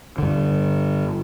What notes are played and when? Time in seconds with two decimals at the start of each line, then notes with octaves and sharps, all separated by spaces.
0.18 G2 D3